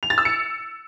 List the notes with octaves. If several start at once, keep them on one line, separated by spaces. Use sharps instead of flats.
F7
A6
E6
C#7